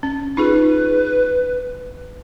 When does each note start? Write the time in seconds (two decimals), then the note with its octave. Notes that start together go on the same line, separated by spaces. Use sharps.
0.03 C#4
0.37 D#4 F4 G#4 B4